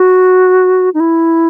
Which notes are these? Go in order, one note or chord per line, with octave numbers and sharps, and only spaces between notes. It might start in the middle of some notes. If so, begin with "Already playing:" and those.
Already playing: F#4
D#4
E4